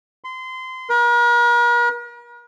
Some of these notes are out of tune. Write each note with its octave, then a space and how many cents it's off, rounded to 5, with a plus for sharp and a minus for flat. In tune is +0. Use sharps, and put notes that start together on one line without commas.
C6 -25
A#4 +45